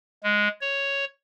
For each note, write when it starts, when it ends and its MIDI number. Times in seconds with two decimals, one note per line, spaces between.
0.23 0.48 56
0.61 1.05 73